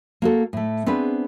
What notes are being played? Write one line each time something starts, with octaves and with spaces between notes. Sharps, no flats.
A#3 F#4 A4
A2 A3
B3 C4 D4 G#4 B4